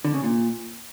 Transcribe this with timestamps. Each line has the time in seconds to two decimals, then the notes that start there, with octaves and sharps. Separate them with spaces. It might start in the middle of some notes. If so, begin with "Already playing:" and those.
0.05 D3
0.14 C#3
0.24 A#2